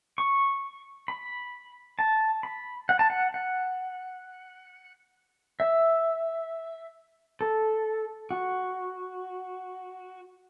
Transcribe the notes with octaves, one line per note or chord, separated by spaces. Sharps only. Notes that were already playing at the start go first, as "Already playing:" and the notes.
C#6
B5
A5
B5
F#5
A5
F#5
F#5
E5
A4
F#4